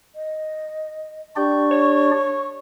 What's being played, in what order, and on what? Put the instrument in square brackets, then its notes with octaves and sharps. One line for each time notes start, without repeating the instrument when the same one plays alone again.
[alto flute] D#5
[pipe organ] D4 G4 D5 [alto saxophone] G5 [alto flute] C#6
[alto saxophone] C#5